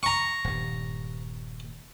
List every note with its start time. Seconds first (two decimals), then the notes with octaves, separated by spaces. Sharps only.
0.03 A#5 C#6
0.44 D#1 G2